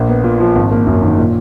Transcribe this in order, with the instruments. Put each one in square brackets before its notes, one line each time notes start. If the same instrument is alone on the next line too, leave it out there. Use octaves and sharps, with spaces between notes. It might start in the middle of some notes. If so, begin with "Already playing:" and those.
Already playing: [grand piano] A#1 A#3
B3
A#2
F3
G#1
A#3
F#2
D#3
A#2